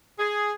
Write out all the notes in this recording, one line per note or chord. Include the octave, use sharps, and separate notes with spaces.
G#4